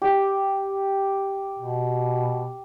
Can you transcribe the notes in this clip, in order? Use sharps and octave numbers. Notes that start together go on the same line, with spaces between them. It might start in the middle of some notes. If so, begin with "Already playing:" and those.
G4
B2